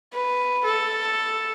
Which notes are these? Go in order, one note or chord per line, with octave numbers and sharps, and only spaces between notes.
B4
A4